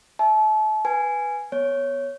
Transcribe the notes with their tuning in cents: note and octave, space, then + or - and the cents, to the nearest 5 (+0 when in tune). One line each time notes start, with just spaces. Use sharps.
E5 +0 A5 -35
B4 +0 G#5 +0
B3 +0 C#5 +0